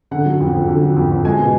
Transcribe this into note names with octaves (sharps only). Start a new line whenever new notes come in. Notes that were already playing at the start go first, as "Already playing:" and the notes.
D3 F#5
F#3
F2
F2
D3
F#3
F2
F2
G#3 G#5
B2